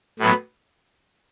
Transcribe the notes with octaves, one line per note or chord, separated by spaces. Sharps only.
A2 F#3 B3